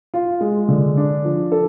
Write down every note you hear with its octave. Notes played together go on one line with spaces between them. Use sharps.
F4
G#3
D3
D4
F3
A4